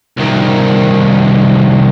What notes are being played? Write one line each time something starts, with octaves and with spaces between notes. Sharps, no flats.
C2 D#3